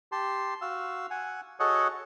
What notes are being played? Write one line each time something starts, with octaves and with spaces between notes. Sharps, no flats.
G4 A5 C6
F#4 F5 E6
F#5 G#5
F#4 G#4 A4 C#5 D#5 F#5